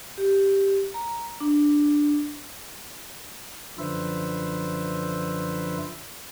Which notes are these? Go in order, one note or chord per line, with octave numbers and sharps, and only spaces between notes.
G4
A#5
D4
F#2 D3 F3 B4 C5 E5